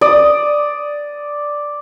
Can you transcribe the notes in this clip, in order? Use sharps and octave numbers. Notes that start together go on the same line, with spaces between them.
D5 D#6